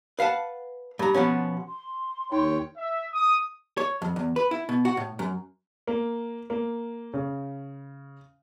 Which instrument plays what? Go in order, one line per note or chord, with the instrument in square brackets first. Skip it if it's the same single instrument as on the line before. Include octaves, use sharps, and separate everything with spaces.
[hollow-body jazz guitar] B4 F5 F#5 A5
G2 A#5
B2 F3 B3 C#4
[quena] C6
[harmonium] D#2 C#5 G5 [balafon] D#4
[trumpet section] E5
D#6
[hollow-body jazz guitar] C#5
F2
E2
B4
E4
B2
F#4
A2
F#2
[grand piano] A#3
A#3
C#3